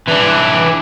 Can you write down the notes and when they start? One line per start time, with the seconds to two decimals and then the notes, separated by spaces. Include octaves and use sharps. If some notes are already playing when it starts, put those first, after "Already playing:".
0.08 E3 D4